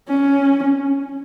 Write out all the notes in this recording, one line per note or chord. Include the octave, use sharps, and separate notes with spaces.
C#4